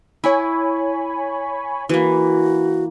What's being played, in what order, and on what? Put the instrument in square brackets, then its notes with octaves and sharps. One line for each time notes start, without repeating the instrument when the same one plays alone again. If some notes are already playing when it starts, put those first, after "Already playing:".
[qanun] E4 [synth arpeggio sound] C#5 G#5 B5
[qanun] E3 A#3 [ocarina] F#4